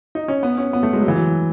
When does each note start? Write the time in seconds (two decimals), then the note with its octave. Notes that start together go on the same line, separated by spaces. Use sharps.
0.15 D#4
0.28 C#4
0.43 B3
0.58 C#4
0.73 B3
0.83 A3
0.93 G#3
1.00 F#3
1.08 E3
1.15 F#3